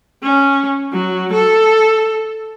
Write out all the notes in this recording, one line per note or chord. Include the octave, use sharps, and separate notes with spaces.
C#4
F#3
A4